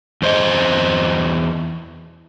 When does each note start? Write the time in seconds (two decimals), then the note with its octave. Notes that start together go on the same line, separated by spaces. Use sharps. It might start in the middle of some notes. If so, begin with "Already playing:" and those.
0.22 E2 C5 D#5